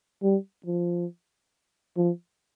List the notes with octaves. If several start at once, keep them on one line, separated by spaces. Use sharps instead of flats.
G3
F3
F3